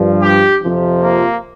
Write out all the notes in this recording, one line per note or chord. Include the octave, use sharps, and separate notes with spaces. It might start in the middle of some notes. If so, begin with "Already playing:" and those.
Already playing: G2 F3
G4
F2 C3 F3
A#3